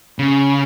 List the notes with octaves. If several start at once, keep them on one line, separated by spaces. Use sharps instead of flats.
C#3